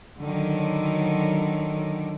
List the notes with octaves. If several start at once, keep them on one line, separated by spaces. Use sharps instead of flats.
D3 D#3 F#3